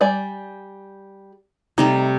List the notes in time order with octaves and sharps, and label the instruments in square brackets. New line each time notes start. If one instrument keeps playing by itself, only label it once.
[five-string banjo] G3 D5 G#5
[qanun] C3 G3 A3 [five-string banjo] D#4